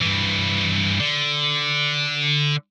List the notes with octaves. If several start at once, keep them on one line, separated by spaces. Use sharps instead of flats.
G2 E3
D3